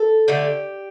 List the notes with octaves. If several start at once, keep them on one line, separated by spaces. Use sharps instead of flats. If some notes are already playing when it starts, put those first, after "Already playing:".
Already playing: A4
D3 A3 G4